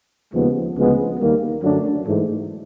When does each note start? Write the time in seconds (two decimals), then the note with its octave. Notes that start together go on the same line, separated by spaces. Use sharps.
0.33 D#2 C#3 F3 G#3 B3
0.76 D2 C#3 F3 G#3 B3
1.20 D#2 D#3 G3 A#3
1.62 F#2 D3 F#3 A3 D4
2.06 G#2 E3 A3